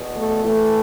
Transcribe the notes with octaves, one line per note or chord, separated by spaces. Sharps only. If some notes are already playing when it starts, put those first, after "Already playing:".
Already playing: E2 B2
A3
A2 E3 A3